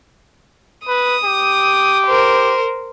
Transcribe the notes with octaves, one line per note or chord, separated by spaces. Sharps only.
B4 D#6
G4
A#4 C5